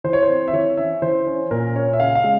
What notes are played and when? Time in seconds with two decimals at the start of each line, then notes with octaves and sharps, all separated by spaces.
0.04 E3 C5
0.13 C#5
0.23 C5
0.29 C4
0.48 E5
0.53 E3 C#5
0.77 C#4 E5
1.02 E3 C5
1.27 C#4
1.51 A#2 A#4
1.75 C#4 C#5
1.93 E5
2.00 C#3 F5
2.15 F5
2.24 G#3